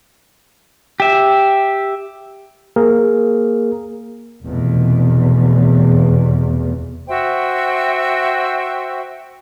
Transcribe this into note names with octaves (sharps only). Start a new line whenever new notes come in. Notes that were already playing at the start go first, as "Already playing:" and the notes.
G4 E5
A#3 G#4 A#4
F1 E2 B2
F#4 C5 E5 G5